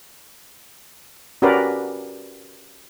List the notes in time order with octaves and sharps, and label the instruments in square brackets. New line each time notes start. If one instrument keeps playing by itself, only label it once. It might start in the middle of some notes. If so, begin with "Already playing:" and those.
[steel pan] C#4 F#4 G4 A#4 B4 D5